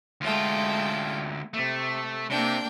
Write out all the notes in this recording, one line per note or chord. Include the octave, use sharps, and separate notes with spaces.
D2 G#3 A3 F4 G5
C3 A3
C3 A#3 D4 G5